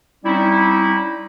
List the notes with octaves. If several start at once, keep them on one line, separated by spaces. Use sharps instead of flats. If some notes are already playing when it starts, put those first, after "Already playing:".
G3 C4 C#4 D#4 E4